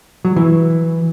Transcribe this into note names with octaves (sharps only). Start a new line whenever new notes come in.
F#3
E3